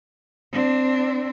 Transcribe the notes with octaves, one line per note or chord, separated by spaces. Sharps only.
C4 D4